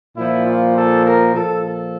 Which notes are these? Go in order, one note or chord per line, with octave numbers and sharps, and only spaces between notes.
A#2 F3 E4
F4
A4
A#4
A#2 F3 A4
A4